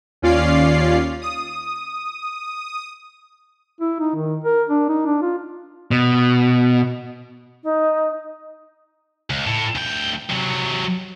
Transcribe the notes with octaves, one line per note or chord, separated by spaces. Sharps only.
D#2 C#4 F4 D5 F5 C7
D#6
E4
D#4
D#3
A#4
D4
D#4
D4
F4
B2
D#4
C#2
A2
D2 G5
C3 F#3